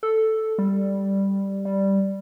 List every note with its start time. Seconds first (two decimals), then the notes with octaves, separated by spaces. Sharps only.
0.03 A4
0.58 G3
1.65 G3